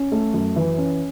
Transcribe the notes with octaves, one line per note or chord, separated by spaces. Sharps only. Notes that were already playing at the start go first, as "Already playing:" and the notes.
Already playing: C#4
A3
F#2
E3
C#4